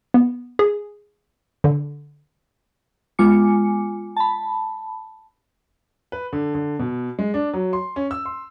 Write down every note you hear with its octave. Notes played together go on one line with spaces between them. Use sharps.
B3
G#4
D3
G#3 B3 F4 G#5 D6 C#7
A5 B5
B4
D3
D3
B2
G#3
D4
F#3
C6
C#4
E6
C6